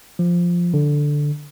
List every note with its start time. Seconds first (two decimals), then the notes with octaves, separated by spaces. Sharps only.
0.19 F3
0.74 D3